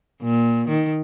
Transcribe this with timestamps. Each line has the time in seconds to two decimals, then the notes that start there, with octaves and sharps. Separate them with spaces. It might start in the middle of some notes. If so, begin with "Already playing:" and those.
0.22 A#2
0.68 D#3